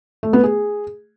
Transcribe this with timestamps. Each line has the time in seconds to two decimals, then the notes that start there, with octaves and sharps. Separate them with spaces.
0.23 A3
0.33 B3
0.43 G#4